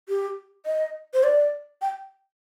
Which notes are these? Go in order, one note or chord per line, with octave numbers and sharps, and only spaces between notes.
G4
D#5
C5
D5
G5